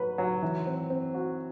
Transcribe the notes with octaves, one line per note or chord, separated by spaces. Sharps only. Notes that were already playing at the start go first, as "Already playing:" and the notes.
Already playing: F#3 B4
F#3
E3
C4
C4
F#4